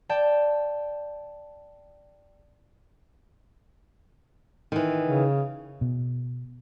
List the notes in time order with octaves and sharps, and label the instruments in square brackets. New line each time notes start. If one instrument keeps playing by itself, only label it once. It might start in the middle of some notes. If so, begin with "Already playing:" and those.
[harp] D5 G5 A5
[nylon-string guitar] D#3 E3
[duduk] C#3
[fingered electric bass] B2